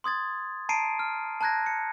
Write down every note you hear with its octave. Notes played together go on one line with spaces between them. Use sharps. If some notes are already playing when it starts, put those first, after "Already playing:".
C6 D#6 G#6 A6
A5 A#5 C7 D7 D#7
F6
A5 A#5 F#6 G#6 A#6
C#7